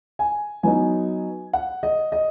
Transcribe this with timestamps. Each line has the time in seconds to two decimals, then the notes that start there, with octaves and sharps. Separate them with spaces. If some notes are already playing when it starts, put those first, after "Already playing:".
0.19 G#5
0.63 F#3 B3 D#4 G#5
1.53 F#5
1.83 D#5
2.12 D#5